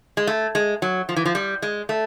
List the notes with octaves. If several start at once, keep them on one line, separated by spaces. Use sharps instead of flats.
G#3
A3
G#3
F#3
F3
E3
F3
G3
G#3
A3